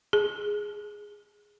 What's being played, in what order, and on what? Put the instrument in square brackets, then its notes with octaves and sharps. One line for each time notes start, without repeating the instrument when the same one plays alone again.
[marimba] G#4